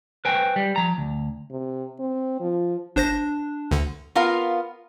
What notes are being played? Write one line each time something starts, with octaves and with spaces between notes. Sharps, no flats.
B4 C5 G5 G#5
G3
F3 A#5
D2
C3
C4
F3
G1 D4 C5 A#6
D2 D3
B3 F4 A#4 F5